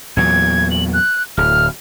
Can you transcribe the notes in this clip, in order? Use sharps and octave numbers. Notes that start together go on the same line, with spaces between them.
E2 A#2 F#3 G#6
F#7
F#6
D1 F6